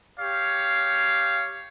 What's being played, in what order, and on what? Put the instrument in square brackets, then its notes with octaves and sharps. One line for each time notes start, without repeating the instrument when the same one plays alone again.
[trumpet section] G4 C#5 F5